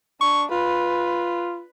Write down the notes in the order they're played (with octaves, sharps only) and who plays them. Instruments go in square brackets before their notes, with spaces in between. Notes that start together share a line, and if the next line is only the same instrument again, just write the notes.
[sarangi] D4 [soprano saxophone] C#6
[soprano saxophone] F4 [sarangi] B4